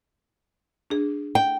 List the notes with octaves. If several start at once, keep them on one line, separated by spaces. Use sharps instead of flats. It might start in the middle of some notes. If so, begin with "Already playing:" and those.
D4 G#4
G5